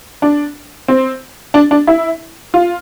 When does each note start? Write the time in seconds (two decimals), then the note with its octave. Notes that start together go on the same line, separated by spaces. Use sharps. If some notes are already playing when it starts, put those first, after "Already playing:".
0.22 D4
0.88 C4
1.54 D4
1.71 D4
1.87 E4
2.54 F4